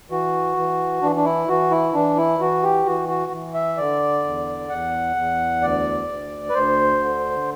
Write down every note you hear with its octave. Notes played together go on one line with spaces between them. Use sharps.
E3 F#4
E3
E3 D4
D4
E4
E3 F#4
E4
E3 D4
E4
E3 F#4
G4
E3 F#4
F#4
E3
E5
D3 D5
E2
E2 F#5
E2
D2 D5
D2
B4
D2 C5
D3